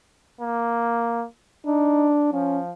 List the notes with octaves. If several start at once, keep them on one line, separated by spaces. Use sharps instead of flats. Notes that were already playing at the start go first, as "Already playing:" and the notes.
A#3
D4 D#4
F3 C#4